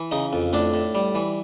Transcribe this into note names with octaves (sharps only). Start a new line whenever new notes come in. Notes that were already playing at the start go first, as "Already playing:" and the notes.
Already playing: E3
C#3 D#4
F2
A2 D4
A2
G3
E3